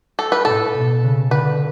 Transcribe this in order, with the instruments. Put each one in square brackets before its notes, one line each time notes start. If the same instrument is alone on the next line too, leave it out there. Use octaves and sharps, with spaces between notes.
[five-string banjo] A4
B4
[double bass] A2 [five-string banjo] A4
[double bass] B2
C#3
[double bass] D3 [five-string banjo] B4